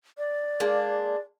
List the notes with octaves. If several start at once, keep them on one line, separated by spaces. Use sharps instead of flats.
D5
G#3 A#3 D4